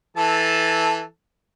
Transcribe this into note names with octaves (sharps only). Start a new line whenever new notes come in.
E3 A4 A5